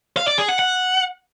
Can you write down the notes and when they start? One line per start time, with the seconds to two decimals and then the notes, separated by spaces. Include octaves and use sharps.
0.17 F5
0.28 D5
0.38 G#4
0.49 F#5
0.59 F#5